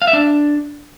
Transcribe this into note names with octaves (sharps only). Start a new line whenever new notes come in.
F5
E5
D4